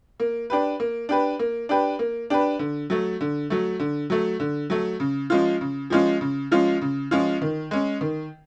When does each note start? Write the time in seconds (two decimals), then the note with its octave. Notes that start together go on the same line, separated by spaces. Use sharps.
0.20 A#3
0.50 D4 G4 B4
0.80 A#3
1.09 D4 G4 B4
1.39 A#3
1.69 D4 G4 B4
1.99 A#3
2.30 D4 G4 B4
2.59 D3
2.90 F#3 A3
3.21 D3
3.50 F#3 A3
3.80 D3
4.10 F#3 A3
4.40 D3
4.70 F#3 A3
5.00 C#3
5.30 F3 G#3 C#4 F4
5.61 C#3
5.90 F3 G#3 C#4 F4
6.21 C#3
6.51 F3 G#3 C#4 F4
6.81 C#3
7.11 F3 G#3 C#4 F4
7.42 D#3
7.71 G#3 C#4
8.01 D#3